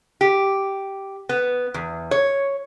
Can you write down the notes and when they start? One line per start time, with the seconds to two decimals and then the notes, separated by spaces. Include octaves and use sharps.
0.21 G4
1.29 B3
1.74 E2
2.11 C#5